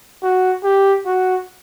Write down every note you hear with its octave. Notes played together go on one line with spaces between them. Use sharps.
F#4
G4
F#4